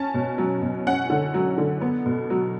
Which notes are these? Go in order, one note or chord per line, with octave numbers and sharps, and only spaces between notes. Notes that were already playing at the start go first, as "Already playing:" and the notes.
Already playing: C#4 A5
B2
F#3
B2
C#4 F#5
D3
F#3
D3
B3
B2
F#3